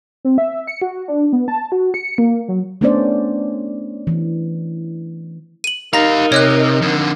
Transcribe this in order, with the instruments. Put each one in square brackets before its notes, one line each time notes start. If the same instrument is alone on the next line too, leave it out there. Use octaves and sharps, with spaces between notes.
[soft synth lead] C4
E5
C#7
F#4
D4
B3
A5
F#4
C#7
A#3
F#3
[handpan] A3 B3 C#4 D4 C5 D5
E3
[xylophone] D#7 F#7
[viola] D#4 A#4 [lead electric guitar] G4 F5 [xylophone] A#5 A#6
[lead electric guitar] C3 [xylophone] C#5 D#5 F#6
[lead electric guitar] F2 D3